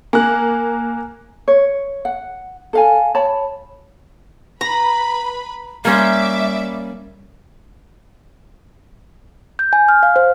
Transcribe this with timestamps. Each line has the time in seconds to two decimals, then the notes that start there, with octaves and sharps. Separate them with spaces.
0.13 A#3 G#5 F#6
1.48 C#5
2.05 F#5
2.73 A4 F5 G#5
3.15 C#5 A5 B5
4.61 B4 A#5 B5
5.85 G3 A#3 C#4 C5 E5 D6
9.59 G6
9.73 G#5
9.89 F6
10.03 F5
10.16 C5